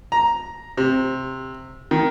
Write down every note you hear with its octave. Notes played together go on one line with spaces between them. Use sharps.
A#5
C3
D#3